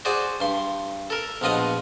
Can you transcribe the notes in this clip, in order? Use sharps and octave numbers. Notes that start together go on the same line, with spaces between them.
F#4 G#4 C5 D5
G2 C6
A4 A#4
A#1 B2 F3 F4 D#5 F#5